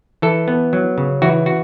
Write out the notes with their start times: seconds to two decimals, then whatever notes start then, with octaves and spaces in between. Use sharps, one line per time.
0.22 E3 A4
0.48 B3
0.73 F#3
0.98 C#3
1.22 E3 F#4
1.46 F#4